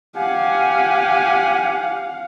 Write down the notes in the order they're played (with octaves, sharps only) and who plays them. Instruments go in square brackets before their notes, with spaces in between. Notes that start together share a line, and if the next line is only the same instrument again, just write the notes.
[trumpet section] G4 G#5 [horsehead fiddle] F5 F#5